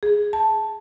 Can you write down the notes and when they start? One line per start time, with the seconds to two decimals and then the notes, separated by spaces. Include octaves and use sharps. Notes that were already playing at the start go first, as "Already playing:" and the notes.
0.03 G#4
0.33 A5